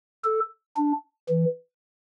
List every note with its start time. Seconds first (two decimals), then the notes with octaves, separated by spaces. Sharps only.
0.24 A4
0.76 D4
1.29 E3